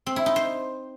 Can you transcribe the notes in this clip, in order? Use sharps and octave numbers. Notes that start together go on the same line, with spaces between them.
C4
E4
D#4
C5